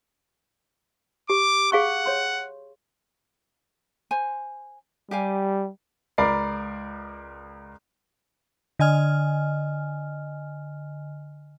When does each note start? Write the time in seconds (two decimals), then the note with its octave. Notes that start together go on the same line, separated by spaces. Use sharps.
1.30 G4 D6
1.72 G#4 F5 F#5 C#6
2.06 C#5 C6
4.11 C5 G#5
5.11 G3 G4 F5 G#5
6.18 C#2 A#4 D5 B5 C7
8.79 D3 D#5 G#5 F6